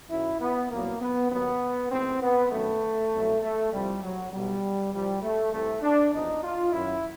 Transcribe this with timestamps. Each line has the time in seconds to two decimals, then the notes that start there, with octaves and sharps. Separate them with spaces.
0.10 F#2 D#3 F#3 E4
0.39 B3
0.70 C2 A#2 F#3 A#3
1.00 B3
1.30 D#2 D#3 F#3 B3
1.90 A1 G#2 D#3 C4
2.21 B3
2.51 F#2 D#3 F#3 A3
3.12 C2 B2 F#3
3.42 A3
3.72 C2 C3 F3 G3
4.02 F#3
4.32 B1 B2 F#3 G3
4.93 C2 C3 F3 G3
5.22 A3
5.53 C2 C3 E3 A3
5.82 D4
6.13 E2 C3 F3 D#4
6.43 F4
6.73 F#2 D#3 F#3 E4